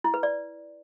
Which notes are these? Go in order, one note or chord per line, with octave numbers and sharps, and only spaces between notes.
E4
B4
D5